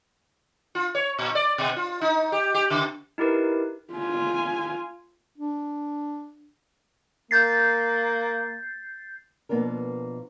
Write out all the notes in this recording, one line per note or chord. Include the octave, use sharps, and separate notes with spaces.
F4
C#5
A#2
D5
B2
F4
D#4
G4
G4
C#3
D#4 E4 G4 A#4 B4
F4 G#5
D4
A#3 G6 A6 C7
B2 F3 A#3 B3 D4 A#4